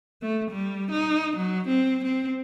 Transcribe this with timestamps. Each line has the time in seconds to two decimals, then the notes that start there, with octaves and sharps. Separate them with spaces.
0.22 A3
0.51 G3
0.91 D#4
1.36 F#3
1.68 C4
2.04 C4